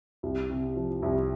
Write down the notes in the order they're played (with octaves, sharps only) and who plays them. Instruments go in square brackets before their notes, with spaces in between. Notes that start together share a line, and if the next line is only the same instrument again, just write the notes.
[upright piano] C2
C3
F3
C2